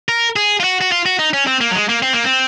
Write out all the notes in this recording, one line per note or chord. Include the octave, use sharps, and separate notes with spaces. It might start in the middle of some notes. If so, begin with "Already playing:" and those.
A#4
G#4
F4
F#4
F#4
F4
F#4
D#4
C#4
C4
A#3
F#3
G#3
A#3
C4
A#3
C4